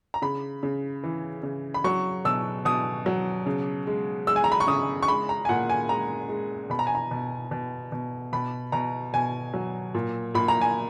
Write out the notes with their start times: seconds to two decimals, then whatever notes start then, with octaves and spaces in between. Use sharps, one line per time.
0.14 A#5
0.22 C#3 B5
0.63 C#3
1.03 E3
1.43 C#3
1.74 B5
1.84 F#3 C#6
2.25 B2 E6
2.65 B2 D#6
3.06 F#3
3.46 C#3
3.87 G#3
4.27 G#3 E6
4.36 G#5
4.44 A#5
4.52 B5
4.60 C#6
4.68 C#3 D#6
5.03 C#6
5.08 G#3 B5
5.29 A#5
5.45 G#5
5.49 A#2 F#5
5.69 G#5
5.89 G#3 A#5
6.29 G#3
6.70 B2 B5
6.79 A#5
6.87 G#5
6.95 A#5
7.11 B2
7.51 B2
7.92 B2
8.33 B2 B5
8.72 B2 A#5
9.13 B2 G#5
9.54 F#3
9.95 A#2
10.34 A#2 B5
10.48 A#5
10.61 G#5